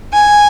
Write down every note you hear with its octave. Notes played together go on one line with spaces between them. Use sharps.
G#5